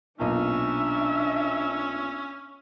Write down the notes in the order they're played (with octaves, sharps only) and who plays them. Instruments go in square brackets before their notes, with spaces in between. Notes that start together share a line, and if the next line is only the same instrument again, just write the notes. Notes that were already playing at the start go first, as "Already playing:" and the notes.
[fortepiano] B1 A#2 [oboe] C#4 [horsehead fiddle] D4 E5